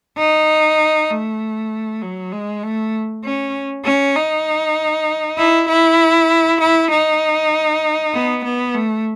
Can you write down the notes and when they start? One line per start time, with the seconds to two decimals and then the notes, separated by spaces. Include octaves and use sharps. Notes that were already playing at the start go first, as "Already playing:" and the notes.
0.18 D#4
1.10 A3
2.02 F#3
2.32 G#3
2.63 A3
3.24 C#4
3.84 C#4
4.16 D#4
5.38 E4
5.69 E4
6.61 E4
6.91 D#4
8.14 B3
8.44 B3
8.74 A3